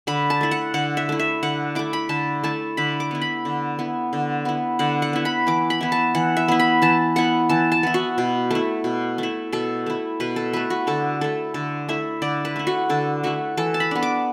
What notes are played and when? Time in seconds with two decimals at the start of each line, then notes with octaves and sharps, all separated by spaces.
0.07 D3 B5
0.30 A5
0.41 A3 E4
0.51 F#5
0.74 D3 F#5
0.97 E5
1.09 A3 E4
1.19 E5
1.43 D3 F#5
1.75 A3 E4 D6
1.93 B5
2.09 D3 A5
2.43 A3 E4 A5
2.77 D3 B5
3.00 D6
3.11 B3 E4
3.21 B5
3.45 D3
3.79 B3 E4
4.13 D3
4.45 B3 E4
4.79 D3 F#5
5.02 F#5
5.13 B3 E4
5.25 B5
5.47 E3 D6
5.70 B5
5.81 B3 E4
5.92 A5
6.15 E3 F#5
6.37 E5
6.48 B3 E4
6.60 B5
6.82 E3 A5
7.16 B3 E4 F#5
7.49 E3 A5
7.72 A5
7.83 B3 E4
7.94 F#4
8.18 B2
8.51 A3 E4
8.84 B2
9.18 A3 E4
9.53 B2 A4
9.86 A3 E4
10.20 B2 B4
10.36 A4
10.53 A3 E4 B4
10.70 F#4
10.87 D3 A4
11.21 A3 E4 A4
11.54 D3 A4
11.88 A3 E4 E5
12.22 D3 D5
12.45 B4
12.56 A3 E4
12.67 F#4
12.89 D3 A4
13.23 A3 E4 F#4
13.57 E3 A4
13.74 A5
13.80 B5
13.91 B3 D4
14.03 D6